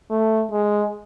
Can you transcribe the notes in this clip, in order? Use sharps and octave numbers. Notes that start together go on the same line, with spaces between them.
A3
G#3